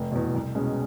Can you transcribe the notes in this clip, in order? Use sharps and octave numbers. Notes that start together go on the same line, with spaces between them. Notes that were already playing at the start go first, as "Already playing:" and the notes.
Already playing: F1
E2 B2
C2
B2 G#3 C#4